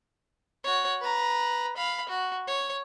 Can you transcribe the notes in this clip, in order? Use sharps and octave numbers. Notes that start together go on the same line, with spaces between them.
F#4 C#5
B4 A#5
F5 B5
F#4
C#5